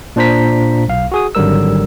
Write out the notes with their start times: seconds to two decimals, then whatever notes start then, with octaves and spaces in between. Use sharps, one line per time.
0.16 A#2 D4 C5 A#5 B6
0.88 B1 F5
1.12 F#4 G#4 D#6
1.35 G#1 D3 F#3 G3 A#4 E6